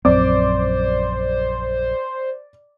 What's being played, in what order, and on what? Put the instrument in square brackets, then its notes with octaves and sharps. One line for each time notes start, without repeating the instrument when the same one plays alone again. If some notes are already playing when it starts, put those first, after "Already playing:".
[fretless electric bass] A#1 F#2 C4 [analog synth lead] C5 [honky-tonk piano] D5 D6